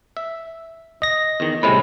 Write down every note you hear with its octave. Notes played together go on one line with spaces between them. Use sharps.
E5
D#5 A#6
E2 D#3
C2 A2 C3 G#3 B5